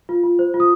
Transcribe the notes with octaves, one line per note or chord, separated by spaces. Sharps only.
F4
F4
C5
F4
D#6